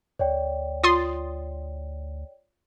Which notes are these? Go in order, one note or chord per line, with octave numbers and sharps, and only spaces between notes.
D2 C#5 D5 G5
F4 C6 D#6 A6